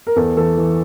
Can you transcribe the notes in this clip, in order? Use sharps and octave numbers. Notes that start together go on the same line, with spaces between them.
A#4
E2 A4
E3 A4
E3